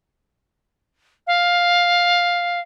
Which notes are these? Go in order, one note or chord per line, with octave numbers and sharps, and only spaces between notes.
F5